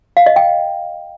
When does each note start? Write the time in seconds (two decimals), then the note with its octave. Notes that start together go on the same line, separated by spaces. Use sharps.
0.17 F5
0.26 D#5
0.36 G5